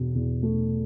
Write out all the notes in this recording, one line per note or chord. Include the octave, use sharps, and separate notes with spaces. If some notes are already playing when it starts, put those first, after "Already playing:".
Already playing: E2 B2
E2
A3